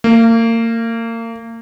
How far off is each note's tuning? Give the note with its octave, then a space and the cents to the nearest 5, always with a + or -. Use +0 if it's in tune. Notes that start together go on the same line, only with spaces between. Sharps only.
A#3 -35